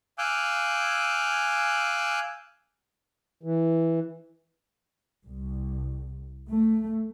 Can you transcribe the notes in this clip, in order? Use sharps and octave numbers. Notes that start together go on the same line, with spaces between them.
F5 G#5 D6 E6 F#6 G6
E3
C2
A3